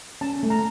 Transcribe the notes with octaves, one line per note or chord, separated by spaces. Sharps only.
C#4 A5
A3
A#5